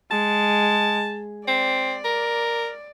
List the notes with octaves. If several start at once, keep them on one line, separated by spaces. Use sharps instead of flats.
G#3 A5
C4 D5
A#4